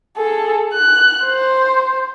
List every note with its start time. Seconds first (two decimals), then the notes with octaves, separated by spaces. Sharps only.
0.17 G#4 A4
0.73 F#6
1.25 C5